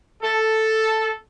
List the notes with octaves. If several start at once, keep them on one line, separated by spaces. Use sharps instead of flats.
A4